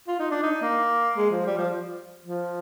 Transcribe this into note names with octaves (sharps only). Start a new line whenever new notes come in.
F4
D#4
D4
D#4
A#3
G#3
F3
G3
F3
F3